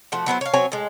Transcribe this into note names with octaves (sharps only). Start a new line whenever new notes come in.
F3 A3 F#4
F#3 B3 E4 C5
C#5 F5
F#3 C4 C#5 G#5
A2 G#3